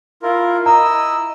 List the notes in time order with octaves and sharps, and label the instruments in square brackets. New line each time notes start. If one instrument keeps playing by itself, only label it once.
[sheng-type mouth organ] E4 F4 A#4
[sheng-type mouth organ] E4 D#5 E6 [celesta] A#5